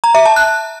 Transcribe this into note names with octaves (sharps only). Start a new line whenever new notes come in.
A#5
E5
A5
F#6